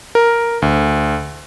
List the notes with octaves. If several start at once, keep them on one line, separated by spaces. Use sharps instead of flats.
A#4
D2